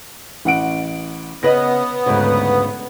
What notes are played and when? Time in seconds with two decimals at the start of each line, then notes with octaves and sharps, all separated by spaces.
0.45 A1 F#5 D7
1.43 C#3 B3 B4 D#5 A#6
2.06 D2 G#2 C#3 B4